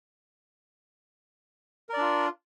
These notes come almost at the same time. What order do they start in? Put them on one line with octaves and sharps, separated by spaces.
A#4 D5 D4 F4